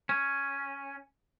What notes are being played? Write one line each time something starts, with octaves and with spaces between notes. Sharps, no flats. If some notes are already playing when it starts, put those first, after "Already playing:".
C#4